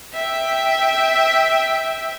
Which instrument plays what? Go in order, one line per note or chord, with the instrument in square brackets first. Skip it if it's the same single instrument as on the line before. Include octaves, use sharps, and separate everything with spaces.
[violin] E5 G5